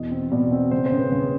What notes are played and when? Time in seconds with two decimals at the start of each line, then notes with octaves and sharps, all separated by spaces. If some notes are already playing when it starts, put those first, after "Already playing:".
Already playing: E2 B2 D#5
0.11 C4
0.32 B2 D5
0.52 C4
0.71 C#3 C5
0.86 C5
0.92 C#3
0.99 B4
1.12 C#3